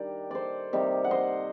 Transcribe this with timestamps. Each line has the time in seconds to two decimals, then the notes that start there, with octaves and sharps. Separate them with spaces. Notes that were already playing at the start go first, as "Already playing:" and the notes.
Already playing: D#3 G3 D4 G4 A#4 D5
0.31 A4 C5 D5
0.73 C3 D#3 G3
1.04 F#5
1.11 C5 D#5